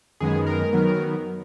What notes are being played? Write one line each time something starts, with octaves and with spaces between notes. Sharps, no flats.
F#2 D#3 G#3 B3 G#4
A#4
D#3 F#3 B3